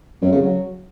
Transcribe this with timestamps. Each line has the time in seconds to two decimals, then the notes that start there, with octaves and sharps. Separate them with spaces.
0.21 F#2
0.32 C#3
0.42 F#3